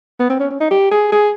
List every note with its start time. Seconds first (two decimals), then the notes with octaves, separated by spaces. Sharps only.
0.20 B3
0.30 C4
0.40 C#4
0.50 C#4
0.61 D#4
0.71 G4
0.91 G#4
1.12 G#4